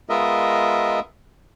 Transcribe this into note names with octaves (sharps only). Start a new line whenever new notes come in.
G#3 B3 F4 A#4 D#5 E5